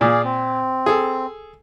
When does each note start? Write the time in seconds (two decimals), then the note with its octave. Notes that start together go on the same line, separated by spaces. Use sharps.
0.01 A#2 G#4 D5 F5
0.24 C4
0.86 G#4 A4